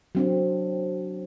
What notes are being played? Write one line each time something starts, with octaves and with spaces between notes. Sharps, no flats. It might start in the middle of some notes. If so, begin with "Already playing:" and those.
F#3 C4 D4